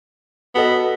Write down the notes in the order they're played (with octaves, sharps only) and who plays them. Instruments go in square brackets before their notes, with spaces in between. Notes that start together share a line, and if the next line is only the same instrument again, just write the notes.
[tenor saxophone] B3 [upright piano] F#4 A4 D#5